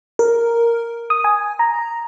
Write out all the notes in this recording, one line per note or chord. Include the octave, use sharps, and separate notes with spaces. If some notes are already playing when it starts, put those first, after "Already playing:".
A#4
D#6
G#5
A#5